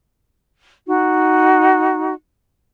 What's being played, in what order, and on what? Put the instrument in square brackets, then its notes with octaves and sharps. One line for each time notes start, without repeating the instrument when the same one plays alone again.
[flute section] D#4 F#4